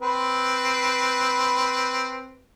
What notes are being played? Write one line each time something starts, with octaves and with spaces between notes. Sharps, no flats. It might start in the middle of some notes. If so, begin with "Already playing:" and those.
C4 B4